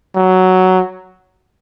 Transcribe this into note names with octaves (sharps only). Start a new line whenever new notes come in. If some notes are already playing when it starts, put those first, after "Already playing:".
F#3